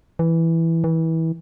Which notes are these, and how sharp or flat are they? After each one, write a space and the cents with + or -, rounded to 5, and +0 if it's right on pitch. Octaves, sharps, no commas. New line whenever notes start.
E3 +0
E3 -25